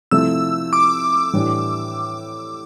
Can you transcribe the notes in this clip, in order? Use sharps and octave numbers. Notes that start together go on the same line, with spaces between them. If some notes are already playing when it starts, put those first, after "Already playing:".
C3 F3 A3 E4 E6
D6
A2 E3 G3 D4